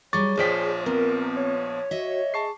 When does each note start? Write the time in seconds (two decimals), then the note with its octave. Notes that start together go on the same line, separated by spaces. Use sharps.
0.13 F#3 G3 G#4 C#5 C#6 D6 A6
0.37 A#1 F3 G#4 C5 D5 G5 B6
0.86 B3 C4 A#4
1.37 C#5
1.91 F#4 D#5 E5
2.34 G#4 A5 C#6 C7